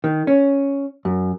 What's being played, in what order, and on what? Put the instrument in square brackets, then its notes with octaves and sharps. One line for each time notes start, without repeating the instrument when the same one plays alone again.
[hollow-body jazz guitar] D#3
C#4
F#2